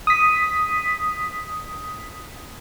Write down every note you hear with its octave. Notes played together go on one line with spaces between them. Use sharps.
D#6 B6